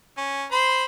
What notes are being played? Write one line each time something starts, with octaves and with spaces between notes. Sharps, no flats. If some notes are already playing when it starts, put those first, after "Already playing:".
C#4
C5 B5 C6